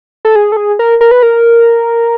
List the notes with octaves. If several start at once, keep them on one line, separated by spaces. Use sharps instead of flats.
A4
G#4
A4
G#4
A#4
A#4
B4
A#4